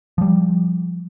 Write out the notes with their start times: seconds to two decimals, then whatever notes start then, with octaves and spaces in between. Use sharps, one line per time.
0.18 F3 G3